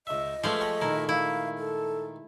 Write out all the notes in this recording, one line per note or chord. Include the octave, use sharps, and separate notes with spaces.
C#2 D#5 E5
F3 G#3 A3 C#4 B4 C6
C#5 G5 B5
A#2 D#3 E4 A#4
E4 F5
A4